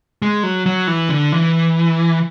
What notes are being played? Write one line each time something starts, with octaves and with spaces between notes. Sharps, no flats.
G#3
F#3
F#3
E3
D3
E3